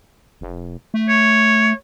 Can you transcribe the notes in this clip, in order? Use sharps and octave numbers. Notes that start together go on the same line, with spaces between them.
F1
A3
C#5